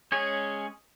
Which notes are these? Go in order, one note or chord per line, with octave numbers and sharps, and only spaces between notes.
G#3 C#4 G#4 C#5